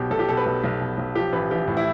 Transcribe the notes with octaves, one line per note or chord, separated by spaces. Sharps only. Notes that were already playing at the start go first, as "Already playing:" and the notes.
Already playing: B1 B2 G4
B1 A4
G4
B2 A4
B4
B1
B1
B2
B1
F3 G4
A1 B4
A1 G4
A2
E4